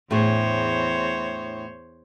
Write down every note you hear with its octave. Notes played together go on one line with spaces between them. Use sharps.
E2 A2 D4 G#4 C5 C#5